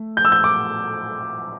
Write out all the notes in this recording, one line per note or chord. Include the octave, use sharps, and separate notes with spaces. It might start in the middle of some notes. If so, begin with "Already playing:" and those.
Already playing: A3
G6
E6
G6
D6